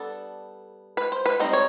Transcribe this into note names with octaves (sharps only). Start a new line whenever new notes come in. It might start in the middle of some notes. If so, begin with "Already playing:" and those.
Already playing: G3 B3 D4 A4
B4
C5
B4
G3 C4 D#4 C5
C#5